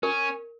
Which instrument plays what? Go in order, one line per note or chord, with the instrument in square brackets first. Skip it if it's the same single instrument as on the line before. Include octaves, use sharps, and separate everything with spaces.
[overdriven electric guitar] C#4 [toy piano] A#4